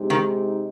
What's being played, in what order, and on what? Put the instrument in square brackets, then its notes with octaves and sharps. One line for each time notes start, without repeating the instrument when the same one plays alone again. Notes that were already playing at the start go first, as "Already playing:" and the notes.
Already playing: [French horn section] C3 G#3 D#4
[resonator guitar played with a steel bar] D#3